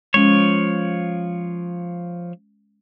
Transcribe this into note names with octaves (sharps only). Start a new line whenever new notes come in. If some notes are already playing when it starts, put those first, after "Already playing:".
F3 G#3 C#4 C#5